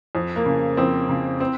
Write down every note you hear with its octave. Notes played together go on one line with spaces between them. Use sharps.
F2
A#3
C#3
F2 C4
C#3
C4